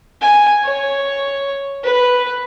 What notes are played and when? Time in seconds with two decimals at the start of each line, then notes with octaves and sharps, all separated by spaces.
0.21 G#5
0.64 C#5
1.83 B4